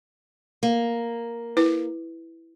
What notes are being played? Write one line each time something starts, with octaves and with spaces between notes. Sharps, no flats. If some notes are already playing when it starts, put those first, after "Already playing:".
A#3
E4 B4